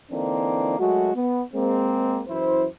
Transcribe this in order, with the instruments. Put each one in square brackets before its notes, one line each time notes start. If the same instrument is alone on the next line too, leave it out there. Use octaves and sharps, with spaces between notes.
[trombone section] D3 E3 A#3 C4 D4 D#4
F#3 G#3 A3 F#4
B3
G#3 A#3 C4
F#2 E3 E4 C5